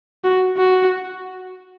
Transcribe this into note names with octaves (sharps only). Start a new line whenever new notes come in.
F#4
F#4